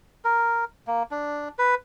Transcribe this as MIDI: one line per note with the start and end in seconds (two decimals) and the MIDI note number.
0.24 0.64 70
0.87 1.03 58
1.11 1.49 62
1.59 1.75 71